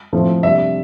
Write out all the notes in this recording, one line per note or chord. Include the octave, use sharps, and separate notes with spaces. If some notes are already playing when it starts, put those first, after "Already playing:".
A2 F3 C4
C3 G3 D4 E5